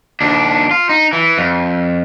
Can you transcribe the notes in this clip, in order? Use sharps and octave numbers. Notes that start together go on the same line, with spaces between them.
D#2 D4
F4
D#4
E3
F2